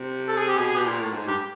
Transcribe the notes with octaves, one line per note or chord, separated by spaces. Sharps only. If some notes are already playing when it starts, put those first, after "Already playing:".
Already playing: C3
A4
G#4
G4
B2 G#4
G#4
B2 G4
A#2
A2
G#2
G2 G4